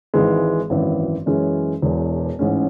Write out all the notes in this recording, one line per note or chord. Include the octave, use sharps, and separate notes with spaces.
G#1 G#2 E3 G#3
G#1 F#2 E3
F#2 E3 G#3 C#4
E1 E2 B2
A1 G#2 G#3 C#4